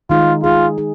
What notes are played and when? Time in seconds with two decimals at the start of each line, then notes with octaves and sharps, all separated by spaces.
0.10 D#3 G#3 D#4 F4 G#4
0.43 D#3 G#3 D#4 F4 G#4
0.78 D#4 G#4